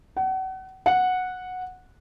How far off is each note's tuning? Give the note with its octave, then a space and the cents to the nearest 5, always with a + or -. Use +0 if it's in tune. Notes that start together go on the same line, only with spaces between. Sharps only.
F#5 +35
F#5 -10